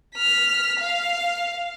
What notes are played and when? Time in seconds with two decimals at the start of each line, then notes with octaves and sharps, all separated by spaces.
0.15 F6 B6
0.79 F5